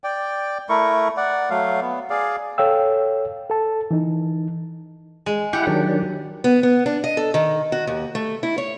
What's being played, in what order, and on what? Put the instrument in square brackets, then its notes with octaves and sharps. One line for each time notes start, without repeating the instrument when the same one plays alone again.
[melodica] D5 G5
A3 E4 A#4 C#6
D5 F#5
F#3 A3 F5
B3
G#4 D5 F5
[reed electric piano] A4 C#5 F5 G5 E6
A4 A5
E3 D#4
[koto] G#3
[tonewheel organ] E4 F#5 [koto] G4
[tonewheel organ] D#3 F#3 D4
[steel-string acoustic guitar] B3
B3
D4
D#5
A4
D#3
F#4
D#2
A3
E4
C#5